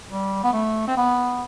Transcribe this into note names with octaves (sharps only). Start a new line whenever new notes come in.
G3
B3
A3
C4
B3